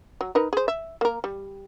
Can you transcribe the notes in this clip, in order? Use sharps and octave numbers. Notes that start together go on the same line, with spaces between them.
F#3
D#4 A#4 B4
G#4 C5
E5
A#3 A#4
G3